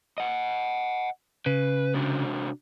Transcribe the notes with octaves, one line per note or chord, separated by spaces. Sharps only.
D#5 F#5
C#3 B4
C3 D4 F#4